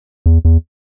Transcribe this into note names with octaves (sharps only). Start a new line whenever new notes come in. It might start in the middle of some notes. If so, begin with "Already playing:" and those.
E2
E2